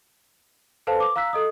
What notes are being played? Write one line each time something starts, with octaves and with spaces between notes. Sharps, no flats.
A4 B4 C5 F5 A5
D6
F5 A#5 E6 F#6 B6
A4 D#5 D#6